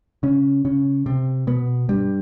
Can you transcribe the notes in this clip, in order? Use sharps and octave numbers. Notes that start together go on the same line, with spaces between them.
C#3 C#4
C#3 C#4
C3 C4
B2 B3
G2 G3